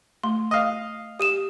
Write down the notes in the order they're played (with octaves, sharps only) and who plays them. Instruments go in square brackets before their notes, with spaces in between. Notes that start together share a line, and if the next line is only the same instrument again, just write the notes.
[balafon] A3 [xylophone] C6
[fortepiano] D#5 F5
[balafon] G4 [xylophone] D#6 D#7 E7